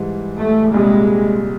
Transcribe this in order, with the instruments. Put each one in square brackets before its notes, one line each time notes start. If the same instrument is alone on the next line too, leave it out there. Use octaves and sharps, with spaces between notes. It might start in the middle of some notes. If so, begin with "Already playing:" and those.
Already playing: [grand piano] G#2 E3 G3
[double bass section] A3
[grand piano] C2 A#2 G3 [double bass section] G#3